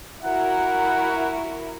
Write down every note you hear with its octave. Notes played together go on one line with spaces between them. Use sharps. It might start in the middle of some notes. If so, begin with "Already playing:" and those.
E4 F#4 A#4 F#5